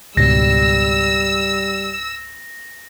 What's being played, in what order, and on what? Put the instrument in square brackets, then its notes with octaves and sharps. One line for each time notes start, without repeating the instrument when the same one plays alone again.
[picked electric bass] C#2 G#2 B2 [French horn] G3 [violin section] E6 [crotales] A#6